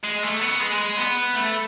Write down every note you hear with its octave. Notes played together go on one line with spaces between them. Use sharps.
G#3
A3
B3
G#3
B3
A3